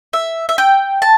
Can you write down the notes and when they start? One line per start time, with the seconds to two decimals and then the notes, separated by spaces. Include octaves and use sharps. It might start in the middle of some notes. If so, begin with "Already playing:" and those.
0.13 E5
0.49 E5
0.58 G5
1.02 A5